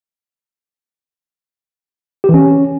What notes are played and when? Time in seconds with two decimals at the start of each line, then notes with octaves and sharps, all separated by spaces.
2.24 G4
2.29 E3
2.34 C#4